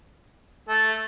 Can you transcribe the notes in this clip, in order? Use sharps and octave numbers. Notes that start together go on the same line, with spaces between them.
A3